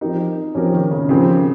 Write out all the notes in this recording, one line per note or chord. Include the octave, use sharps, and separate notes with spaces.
F3 C4 D#4 G4 A#4
F3 C4 C#4 G4 A#4
D#3
C#3
C#3 F3 C4 G4 A#4